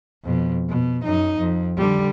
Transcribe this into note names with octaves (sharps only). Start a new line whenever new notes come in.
F2 B2
B2
F#2 D#4
F2
D3 G3